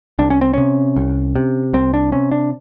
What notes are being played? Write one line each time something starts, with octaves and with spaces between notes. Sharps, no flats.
C2 D4
C#4
C4
C3 C#4
C2
C3
C2 C4
D4
C3 C#4
D4